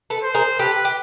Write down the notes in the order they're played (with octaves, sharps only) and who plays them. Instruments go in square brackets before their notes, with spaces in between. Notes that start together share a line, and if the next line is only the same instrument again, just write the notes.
[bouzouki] A4 B4
[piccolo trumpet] C5
[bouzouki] G#4 A#4
[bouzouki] G4 A4 [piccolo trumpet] B4
[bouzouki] G4